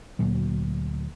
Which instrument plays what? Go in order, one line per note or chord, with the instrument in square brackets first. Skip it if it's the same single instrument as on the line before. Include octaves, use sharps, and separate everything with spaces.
[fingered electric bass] D2 A#2 F#3